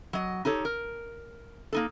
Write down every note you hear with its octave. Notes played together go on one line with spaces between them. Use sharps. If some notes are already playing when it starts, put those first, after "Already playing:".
F#3 D#5
D#4 G4 A4 C#5
A#4
A#3 D#4 A4